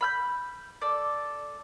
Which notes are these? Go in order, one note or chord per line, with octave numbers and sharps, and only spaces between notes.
B5 F6 G6
A4 D5